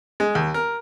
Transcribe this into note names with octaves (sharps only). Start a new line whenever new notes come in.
G#3
D#2
A#4